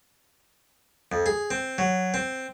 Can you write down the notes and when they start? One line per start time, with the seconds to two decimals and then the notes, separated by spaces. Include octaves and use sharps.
1.12 F2
1.26 G#4
1.51 C4
1.78 F#3
2.14 C4